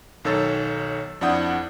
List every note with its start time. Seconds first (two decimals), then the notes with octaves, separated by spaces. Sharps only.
0.24 B1 D#3 A4 C#5 E6 A6
1.21 F2 D4 E4 F#5 D#6 G6